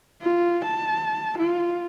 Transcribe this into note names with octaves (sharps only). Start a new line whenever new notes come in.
F4
A5
F4